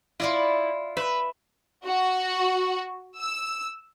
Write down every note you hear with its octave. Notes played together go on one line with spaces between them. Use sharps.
E4 F4 D5 D#5
B4 E5
F#4
E6